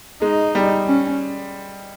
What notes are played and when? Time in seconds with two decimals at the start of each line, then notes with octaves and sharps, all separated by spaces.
0.22 G#3 D#4
0.55 G3
0.87 C#4